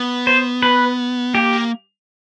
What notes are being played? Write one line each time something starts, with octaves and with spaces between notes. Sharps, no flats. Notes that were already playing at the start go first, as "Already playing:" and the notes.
Already playing: B3
C5
B4
A#3 G4